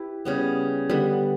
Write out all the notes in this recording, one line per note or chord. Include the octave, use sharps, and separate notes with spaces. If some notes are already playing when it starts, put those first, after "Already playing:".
Already playing: E4 G4 B4
C#3 G3 B3
D3 G3 B3